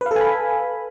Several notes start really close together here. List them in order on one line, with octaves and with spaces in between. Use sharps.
B4 F5 A4 G#5 B5